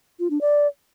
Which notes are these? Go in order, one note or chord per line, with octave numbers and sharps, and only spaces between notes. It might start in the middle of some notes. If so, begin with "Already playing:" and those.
F4
D4
D5